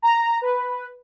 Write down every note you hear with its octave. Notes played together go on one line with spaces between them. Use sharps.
A#5
B4